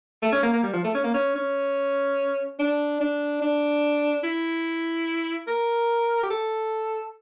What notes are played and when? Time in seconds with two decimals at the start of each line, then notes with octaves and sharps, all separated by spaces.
0.22 A3
0.32 C#4
0.43 A#3
0.53 A#3
0.63 G3
0.74 F3
0.84 A3
0.95 C#4
1.04 A#3
1.14 C#4
1.36 C#4
2.60 D4
3.01 D4
3.42 D4
4.24 E4
5.48 A#4
6.24 G4
6.30 A4